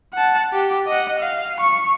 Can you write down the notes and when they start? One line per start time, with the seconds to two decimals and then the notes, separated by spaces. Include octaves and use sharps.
0.13 F#5 A5
0.53 G4
0.87 D#5 F#5
1.19 F5
1.60 C#6